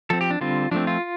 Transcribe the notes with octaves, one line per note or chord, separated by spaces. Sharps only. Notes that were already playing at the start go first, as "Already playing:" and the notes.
F3 C4 A4
G4
D4
D3 G3 C4 F4
F3 A3 C4 D4
F4